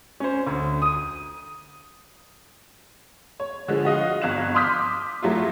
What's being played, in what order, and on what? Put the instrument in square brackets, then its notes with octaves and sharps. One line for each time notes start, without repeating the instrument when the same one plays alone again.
[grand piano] C#4 C5
D2
D#6 D#7
[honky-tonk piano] C#5
D3 F3 G#3
F#4 D#5 F5
G1 F5 F#6 E7
C6 D6 D#6 F6 G6 B6
F#3 A3 E4 F4